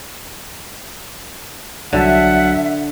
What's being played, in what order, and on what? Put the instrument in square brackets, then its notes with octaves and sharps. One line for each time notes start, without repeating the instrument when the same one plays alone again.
[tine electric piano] C2 F#3 A5 [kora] D3 [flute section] E5 [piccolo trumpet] F#5